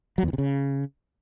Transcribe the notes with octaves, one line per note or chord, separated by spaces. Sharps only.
F#3
E2
E3
C3
C#3